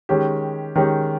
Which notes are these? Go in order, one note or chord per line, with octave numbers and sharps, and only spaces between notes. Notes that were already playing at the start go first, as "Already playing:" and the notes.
D#3 G#3 C#4 G4
D#3 G#3 C#4 G4